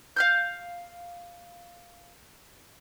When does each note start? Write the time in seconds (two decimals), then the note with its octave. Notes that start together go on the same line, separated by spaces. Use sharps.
0.16 F5 F6 G6